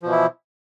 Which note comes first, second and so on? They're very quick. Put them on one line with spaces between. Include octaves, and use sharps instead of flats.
F3 B2 E3 E4